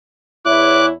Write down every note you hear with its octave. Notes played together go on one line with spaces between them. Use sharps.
E2 E4 C#5 D6 F#6